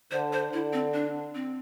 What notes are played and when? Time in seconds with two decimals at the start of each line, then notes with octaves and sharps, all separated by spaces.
0.11 D3 C5
0.33 C5
0.52 D3 E4
0.73 C4
0.94 D4
1.35 C4